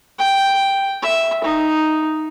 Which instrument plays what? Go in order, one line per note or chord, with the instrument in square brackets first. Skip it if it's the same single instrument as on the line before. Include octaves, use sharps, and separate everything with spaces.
[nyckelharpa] G5
E5
D#4